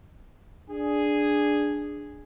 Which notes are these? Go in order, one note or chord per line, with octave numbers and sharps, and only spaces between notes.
D4 G#4